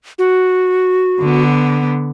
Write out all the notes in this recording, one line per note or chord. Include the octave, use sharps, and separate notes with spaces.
F#4
D3 B3